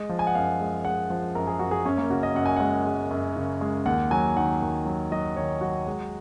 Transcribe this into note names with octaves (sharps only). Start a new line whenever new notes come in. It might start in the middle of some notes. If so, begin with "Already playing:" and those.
Already playing: G#3 D#5
F3
G#5
F#5
F#2 F5
G#3
G#3 F#5
F3
F#2 A#4
G#4
F#2 F#4
G#4
F#2 C#4
A#3
C#3 F#4
D#5
F#2 F#5
G#5
G#3 F#5
G#3
F#2
C#3
G#3
D#2 F#5
F#3 G#5
D#3 F#5
D#2
F#3
F#3 D#5
D#3 C#5
F#3 F#4
G#3